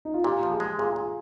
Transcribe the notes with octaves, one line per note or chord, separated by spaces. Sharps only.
D#4
F4
A#2 G4
F3
G#4
G#3
A#2 G#4
A#2